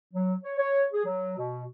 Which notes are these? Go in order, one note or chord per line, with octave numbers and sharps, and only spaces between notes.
F#3
C#5
C#5
G#4
F#3
B2